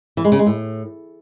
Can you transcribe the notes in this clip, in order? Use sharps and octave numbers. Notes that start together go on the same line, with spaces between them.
E3
G#3
C#3
G#3
A2